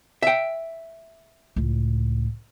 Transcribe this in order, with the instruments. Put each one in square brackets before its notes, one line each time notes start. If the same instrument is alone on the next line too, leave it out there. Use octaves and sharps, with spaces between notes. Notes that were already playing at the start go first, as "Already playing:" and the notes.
[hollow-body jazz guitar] E5 G5
[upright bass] C#2 A2